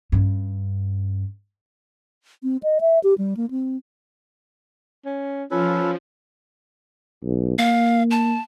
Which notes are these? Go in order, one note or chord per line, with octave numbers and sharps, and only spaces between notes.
G2 C#4
C4
D#5
E5
G4
G3
A#3
C4
C#4
F3 C#4 F4 A4 B4
B1
A#3 F5
A5